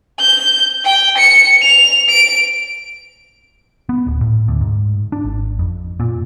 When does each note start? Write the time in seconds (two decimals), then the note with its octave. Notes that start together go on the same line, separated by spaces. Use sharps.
0.20 G6
0.85 G5
1.18 C#7
1.62 F7
2.09 D7
3.89 B3
4.07 D1
4.21 A2
4.48 D2
4.61 G#2
5.12 D4
5.24 G#1
5.59 F2
6.00 A#2